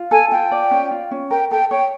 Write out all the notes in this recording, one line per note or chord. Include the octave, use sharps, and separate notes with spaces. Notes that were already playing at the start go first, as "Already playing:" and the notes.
Already playing: F4
A4 G#5
F4 G5
D5
C#4
F4
C#4
A#4 G5
A4 G5
C#5 G5